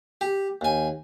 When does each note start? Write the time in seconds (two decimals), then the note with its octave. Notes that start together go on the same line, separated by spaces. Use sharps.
0.21 G4
0.61 D#2 G#5